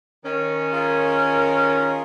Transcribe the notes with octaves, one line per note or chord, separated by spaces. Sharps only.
D#3 C#4
F4 G#4 A#4